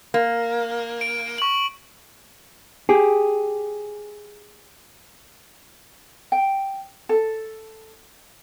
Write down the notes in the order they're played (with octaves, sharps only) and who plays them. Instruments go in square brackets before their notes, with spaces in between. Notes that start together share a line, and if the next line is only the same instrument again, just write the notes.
[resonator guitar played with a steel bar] A#3
[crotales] D7
C#6 F#7
[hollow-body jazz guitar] G4 G#4
[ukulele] G5
A4